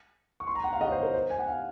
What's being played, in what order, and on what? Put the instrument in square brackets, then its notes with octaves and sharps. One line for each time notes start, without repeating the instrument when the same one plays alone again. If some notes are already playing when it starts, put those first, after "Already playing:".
[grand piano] C#6
C6
A#5
F#5
F5
D#5
C#5
C5
A#4
C5
G#5
F#5
F5